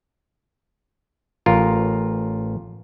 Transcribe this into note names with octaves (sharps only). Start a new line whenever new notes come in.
A1 F4 A#4